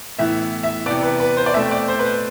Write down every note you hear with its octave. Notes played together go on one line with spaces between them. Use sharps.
A2 E3 B3 E5
E5
C3 E3 B3 D5
B4
B4
C5
D5
B2 A3 C4 E5
D5
C5
B4
C5